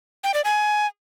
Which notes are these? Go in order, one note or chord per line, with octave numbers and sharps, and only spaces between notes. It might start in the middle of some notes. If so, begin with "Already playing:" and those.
G5
D5
G#5